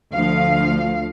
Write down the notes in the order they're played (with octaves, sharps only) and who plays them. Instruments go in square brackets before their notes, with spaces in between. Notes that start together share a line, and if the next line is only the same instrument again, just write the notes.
[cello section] D2 F3 F5